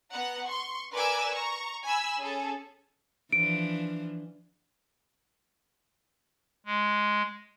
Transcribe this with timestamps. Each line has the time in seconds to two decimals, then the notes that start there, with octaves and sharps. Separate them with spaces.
0.11 B3 F#5 A#5
0.46 C6 C#6
0.92 A#4 B4 D5 G#5 D6 E6
1.32 A#5 C#6
1.84 G#5 B5 E6
2.19 C#4 G#4 A4
3.32 E3 F3 D4 D7
6.66 G#3